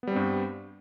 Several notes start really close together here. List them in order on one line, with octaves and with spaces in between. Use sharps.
B3 G3 C4 G2